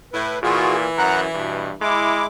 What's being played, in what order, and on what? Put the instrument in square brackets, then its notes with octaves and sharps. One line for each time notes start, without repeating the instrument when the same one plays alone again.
[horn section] A2 E4 [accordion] B4
[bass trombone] A#2 [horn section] E3 [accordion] F4 F#4 G#4
[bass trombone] F#2 [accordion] F#5 A#5 F#6
[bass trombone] G2 [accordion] B2
[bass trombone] G#3 [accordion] E4 D6